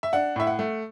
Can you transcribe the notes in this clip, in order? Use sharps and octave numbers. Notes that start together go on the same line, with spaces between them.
E5
D4 F#5
A2 E5
F#5
A3